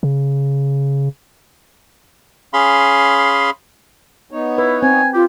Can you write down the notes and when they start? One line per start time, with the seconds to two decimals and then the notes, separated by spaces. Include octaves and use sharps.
0.03 C#3
2.53 C#4 G#4 F5 B5 C6
4.31 B3 D#4 C#5
4.58 E4 B4
4.83 C4 G#5
5.14 F4 G4